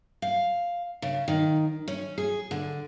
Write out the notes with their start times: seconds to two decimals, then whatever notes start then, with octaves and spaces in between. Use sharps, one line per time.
0.22 F5
1.02 C#3
1.28 D#3
1.88 C#4
2.18 G#4
2.51 D3